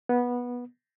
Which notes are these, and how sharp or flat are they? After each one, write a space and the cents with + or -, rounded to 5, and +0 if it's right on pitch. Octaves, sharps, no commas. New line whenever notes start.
B3 -15